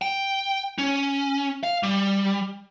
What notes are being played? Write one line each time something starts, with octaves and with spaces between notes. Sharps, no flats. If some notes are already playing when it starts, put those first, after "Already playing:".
G5
C#4
F5
G3